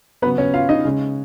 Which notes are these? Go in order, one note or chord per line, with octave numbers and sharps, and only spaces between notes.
C#3 F#3 B3 B4
C#4 C#5
F4 F5
D#4 D#5
C#3 G#3 C#4